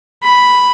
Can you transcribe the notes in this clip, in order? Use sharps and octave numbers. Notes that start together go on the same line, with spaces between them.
B5